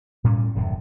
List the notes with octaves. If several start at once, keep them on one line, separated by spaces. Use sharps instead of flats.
A2 G3 C#4
D#1 F#2 A2 C3